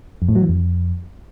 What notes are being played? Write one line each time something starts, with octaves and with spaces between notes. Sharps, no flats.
F2
A2
F#3
E3
F2